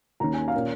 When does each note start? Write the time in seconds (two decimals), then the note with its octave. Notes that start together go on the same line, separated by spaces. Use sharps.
0.20 D#2 D#3 C#4 A#5
0.34 G#5
0.48 F5
0.54 A#2 A#3 C#4